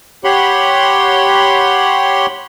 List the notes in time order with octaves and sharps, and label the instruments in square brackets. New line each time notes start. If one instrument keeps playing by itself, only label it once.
[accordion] G4 C#5 F#5 B5 C6